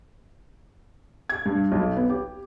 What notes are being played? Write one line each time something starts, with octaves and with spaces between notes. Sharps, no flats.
G#6
G2
B1
B3
G4